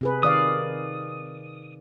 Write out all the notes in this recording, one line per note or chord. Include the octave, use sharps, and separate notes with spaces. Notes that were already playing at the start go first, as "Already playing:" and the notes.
C3 G#4 B4
D#3 D5 F5 D#6